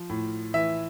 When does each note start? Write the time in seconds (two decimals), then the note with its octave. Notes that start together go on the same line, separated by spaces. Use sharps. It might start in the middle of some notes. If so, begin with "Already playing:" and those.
Already playing: F3
0.10 A2
0.54 E3 E5